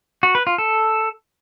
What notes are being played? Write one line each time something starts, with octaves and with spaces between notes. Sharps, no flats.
F#4
B4
F4
A4